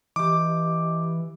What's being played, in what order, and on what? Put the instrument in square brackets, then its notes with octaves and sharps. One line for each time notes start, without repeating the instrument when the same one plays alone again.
[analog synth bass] E3 [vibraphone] G4 D#5 [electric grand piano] D6